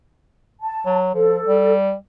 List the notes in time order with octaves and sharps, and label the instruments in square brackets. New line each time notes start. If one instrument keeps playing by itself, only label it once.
[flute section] A5
[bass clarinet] F#3
[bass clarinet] F3 [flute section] A4
[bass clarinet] G3